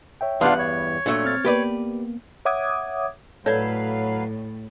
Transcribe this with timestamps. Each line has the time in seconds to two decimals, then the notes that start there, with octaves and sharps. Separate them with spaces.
0.21 C#5 E5 G5
0.41 E2 G2 D4 F4 B4 F5 F#5
0.59 C#5
1.06 A#2 F#3 A3 D4
1.25 C4 F6 A6
1.45 A#3 B3 G4 B4 D5
2.45 C#5 E5 F#5 D6 D#6 G#6
3.46 A2 F#3 A4 B4 C#5 D5 F5